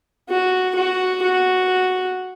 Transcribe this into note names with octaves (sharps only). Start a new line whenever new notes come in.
F#4
F#4
F#4